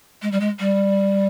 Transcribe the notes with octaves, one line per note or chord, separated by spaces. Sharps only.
G#3
G3
G#3
G3